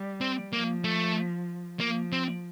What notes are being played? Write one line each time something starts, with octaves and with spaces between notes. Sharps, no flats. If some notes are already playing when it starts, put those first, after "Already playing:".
Already playing: G3
C4
F3 A#3
A3
F3 A#3
C4